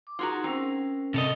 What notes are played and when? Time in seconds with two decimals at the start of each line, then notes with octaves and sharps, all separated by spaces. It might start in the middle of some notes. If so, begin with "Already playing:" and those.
0.07 D6
0.19 D#4 F4 F#4 G#4 A#4 A#5
0.44 C4 C#4 A#4 C5
1.14 C3 A4 D#5